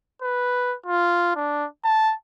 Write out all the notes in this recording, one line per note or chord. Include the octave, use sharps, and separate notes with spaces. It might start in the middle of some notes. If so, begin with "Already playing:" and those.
B4
F4
D4
A5